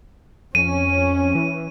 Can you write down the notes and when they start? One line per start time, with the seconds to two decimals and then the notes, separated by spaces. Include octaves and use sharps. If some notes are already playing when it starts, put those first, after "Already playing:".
0.55 F2 C#4 D#7
1.35 E3